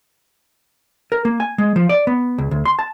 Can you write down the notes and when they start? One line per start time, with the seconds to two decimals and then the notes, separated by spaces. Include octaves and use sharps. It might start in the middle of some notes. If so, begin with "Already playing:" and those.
1.12 A#4
1.25 A#3
1.40 G#5
1.58 G#3
1.76 F3
1.89 D5
2.07 B3
2.38 C#2
2.51 D2
2.65 C6
2.79 A5